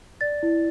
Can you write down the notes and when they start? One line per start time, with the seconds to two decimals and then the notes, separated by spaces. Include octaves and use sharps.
0.21 D5 A6
0.43 E4